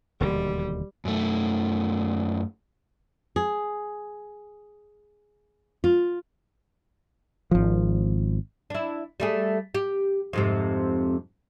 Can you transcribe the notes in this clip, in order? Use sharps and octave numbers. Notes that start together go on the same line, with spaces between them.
E1 D#2 D3 G3
F#2 A3
G#4
F4
G#1 F3
D4 E4
G3 A3 G#4
G4
F2 G#2 C3